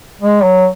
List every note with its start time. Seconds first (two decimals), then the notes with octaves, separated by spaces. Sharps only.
0.21 G#3
0.43 F#3